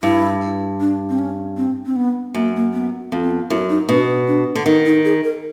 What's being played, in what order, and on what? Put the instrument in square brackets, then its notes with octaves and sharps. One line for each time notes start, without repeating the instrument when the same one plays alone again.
[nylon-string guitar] G2 [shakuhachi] E4
[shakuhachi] D4
C4
C#4
C4
C4
B3
[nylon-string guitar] F#2 [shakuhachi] A#3
[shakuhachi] A#3
B3
[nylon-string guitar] F2 [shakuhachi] B3
[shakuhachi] C4
B3
[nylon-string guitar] F#2 [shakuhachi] E4
[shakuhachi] D#4
[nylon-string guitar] B2 [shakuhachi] D4
[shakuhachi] D4
[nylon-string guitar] D3
[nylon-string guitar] D#3 [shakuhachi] D#4
[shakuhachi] D#4
G#4
A#4